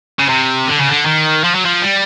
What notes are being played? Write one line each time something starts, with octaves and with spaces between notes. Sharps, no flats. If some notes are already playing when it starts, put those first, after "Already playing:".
C#3
C3
D3
C#3
D3
D#3
F3
F#3
F3
G3